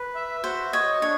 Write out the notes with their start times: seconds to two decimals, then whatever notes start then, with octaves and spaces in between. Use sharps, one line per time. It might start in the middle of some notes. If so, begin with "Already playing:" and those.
Already playing: B4
0.15 E5
0.44 F#4 C5
0.73 C#5 D#5
1.01 D4 C#5